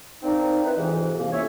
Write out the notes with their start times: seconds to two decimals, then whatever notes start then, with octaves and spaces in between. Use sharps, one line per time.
0.22 A#3 C4 D4 D#4
0.65 C4 D#4 E4 B4
0.77 F2 G#2 C3 E3
1.17 C2 A#3
1.32 F2 C#4 E4 C#5 E5